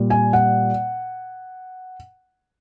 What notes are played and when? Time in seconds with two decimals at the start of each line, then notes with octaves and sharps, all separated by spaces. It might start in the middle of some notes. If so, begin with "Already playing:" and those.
Already playing: A#2 G3
0.10 G#5
0.33 F#5